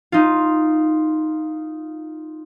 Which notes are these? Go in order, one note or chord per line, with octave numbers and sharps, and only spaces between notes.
D#4 F4